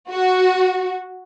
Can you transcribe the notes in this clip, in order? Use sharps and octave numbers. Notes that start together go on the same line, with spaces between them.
F#4